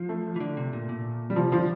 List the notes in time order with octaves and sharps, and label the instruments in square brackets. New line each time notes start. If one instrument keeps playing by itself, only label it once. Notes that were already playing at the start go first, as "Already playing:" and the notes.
Already playing: [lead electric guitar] F3
[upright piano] A3
[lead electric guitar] E3
D3
C3
A#2
A#2
[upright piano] G3
[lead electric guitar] C3 [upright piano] F3
[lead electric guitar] D3 [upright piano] F3